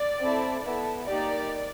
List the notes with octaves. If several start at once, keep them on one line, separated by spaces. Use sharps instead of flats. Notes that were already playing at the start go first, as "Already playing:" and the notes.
Already playing: D5
C4 E4 A4
B3 E4 A4
A#3 D#4 G4 D5